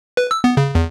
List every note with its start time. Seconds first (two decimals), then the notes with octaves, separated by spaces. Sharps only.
0.17 B4
0.31 E6
0.44 B3
0.57 C#3
0.75 E2